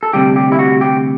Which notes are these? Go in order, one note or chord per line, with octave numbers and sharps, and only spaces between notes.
A4
D2 C3 G3 G4
G4
E4
F#4
G4